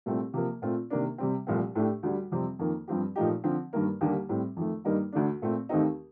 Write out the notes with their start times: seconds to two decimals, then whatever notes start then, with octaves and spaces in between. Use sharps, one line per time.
0.06 C2 A#2 A3 C4
0.34 C3 F3 A#3
0.62 A#2 A3 C4 F4
0.90 C3 D#3 A#3 D4
1.18 C3 G3 C4
1.47 C2 A#2 F3 A3 C4
1.75 A2 A3 D4 G4
2.03 D2 D3 G3
2.31 F2 C3 G3 C4
2.59 F2 D#3 A#3
2.88 G2 F3 C4 G4
3.16 A#2 F3 A3 D#4 G4
3.44 D3 F3 C4
3.73 G2 D#3 A#3
4.01 D#2 D3 G3 A#3
4.29 A2 G3 C4
4.56 F2 D#3 A3
4.84 G2 D#3 G3 A#3 D#4
5.13 D2 D3 A3 D4
5.42 A#2 A3 C4
5.69 D#2 D#3 A3 C4 D#4